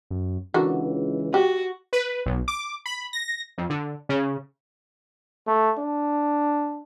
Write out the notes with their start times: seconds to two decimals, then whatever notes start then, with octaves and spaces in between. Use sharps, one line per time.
0.10 F#2
0.54 C#2 D3 E3 F#4 A#4
1.34 F#4 G4
1.93 B4
2.26 B1
2.48 D6
2.86 B5
3.13 A#6
3.58 F2
3.70 D3
4.09 C#3
5.47 A3
5.78 D4